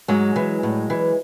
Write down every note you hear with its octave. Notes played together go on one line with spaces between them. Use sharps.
G#2 F#3 G#3
E3
A2
E3